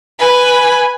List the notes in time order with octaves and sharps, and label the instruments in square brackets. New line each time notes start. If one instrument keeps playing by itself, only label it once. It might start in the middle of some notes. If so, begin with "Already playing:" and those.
[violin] B4 G#5